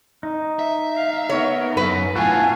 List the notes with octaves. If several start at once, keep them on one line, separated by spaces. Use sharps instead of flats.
D#4
E5
F5
B3 A#4 C#5
F#2 B4
A2 B3 F4 F#4 A4 F5 G#5